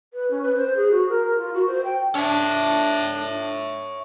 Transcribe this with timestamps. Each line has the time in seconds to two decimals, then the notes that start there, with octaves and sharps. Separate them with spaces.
0.13 B4
0.30 C#4
0.43 B4
0.56 C5
0.76 G#4
0.91 F#4
1.09 A#4
1.23 A#4
1.38 F4
1.54 F#4
1.67 C5
1.85 G5
2.15 D4 C#5 E5